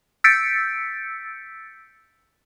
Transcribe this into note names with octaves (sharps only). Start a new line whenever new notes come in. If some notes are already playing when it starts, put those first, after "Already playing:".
E6 G6 A6 B6 C#7 D7